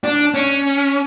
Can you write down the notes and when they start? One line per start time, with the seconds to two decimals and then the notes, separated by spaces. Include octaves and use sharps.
0.04 D4
0.34 C#4